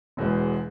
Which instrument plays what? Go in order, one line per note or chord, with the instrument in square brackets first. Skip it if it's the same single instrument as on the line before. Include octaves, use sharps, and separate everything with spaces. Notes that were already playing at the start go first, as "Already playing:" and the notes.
[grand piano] E1 E2 B2 G#3